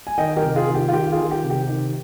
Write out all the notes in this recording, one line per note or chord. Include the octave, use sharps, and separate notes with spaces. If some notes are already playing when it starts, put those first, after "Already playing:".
G#5
D#3 D#5 G5
G4 A#4
C3
F4 G#4
D#3
G4
F4
D#3 G4
F4 G#4
D#3
G4
C3
G4
D#3